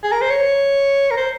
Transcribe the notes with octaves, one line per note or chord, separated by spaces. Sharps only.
G#4
A#4
C5
C#5
A#4
C5